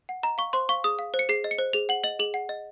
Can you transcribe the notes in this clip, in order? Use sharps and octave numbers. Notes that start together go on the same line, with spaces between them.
F#5
D#5 A#5
F5 C#6
C5 C6
F5 C#6
G#4 D#6
F5
C5
C#7
G#4 C7
D#5
C#7
C5
G#4 F7
F#5 F#7
D#5 F#7
G#4 F#7
F#5
D#5